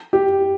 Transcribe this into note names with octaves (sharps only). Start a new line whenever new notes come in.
G4